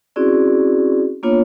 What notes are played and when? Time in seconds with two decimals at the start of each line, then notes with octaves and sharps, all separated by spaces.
0.16 C4 C#4 E4 F#4 G#4 D5
1.23 A#3 B3 D4 F4 C#5